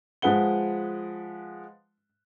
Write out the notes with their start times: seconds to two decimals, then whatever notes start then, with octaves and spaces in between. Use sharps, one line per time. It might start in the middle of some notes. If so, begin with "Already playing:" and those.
0.22 F3 G#3 B4 F#5 G7